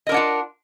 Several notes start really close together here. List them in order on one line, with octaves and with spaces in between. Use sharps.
D#5 A#4 D4 F#5 F4